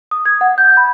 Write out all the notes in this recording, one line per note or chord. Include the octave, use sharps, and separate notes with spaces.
D#6
G#6
F#5
G6
B5